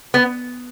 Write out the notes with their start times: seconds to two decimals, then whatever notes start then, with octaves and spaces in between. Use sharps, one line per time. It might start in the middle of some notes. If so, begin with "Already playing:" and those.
0.14 B3